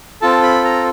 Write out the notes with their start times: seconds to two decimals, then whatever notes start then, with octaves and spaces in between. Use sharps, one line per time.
0.22 C4 F4 A4 A5
0.43 B5
0.64 A#5